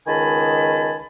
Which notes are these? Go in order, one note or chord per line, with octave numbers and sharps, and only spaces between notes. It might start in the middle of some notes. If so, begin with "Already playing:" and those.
C#2 D#3 D#5 G#5 A5 B5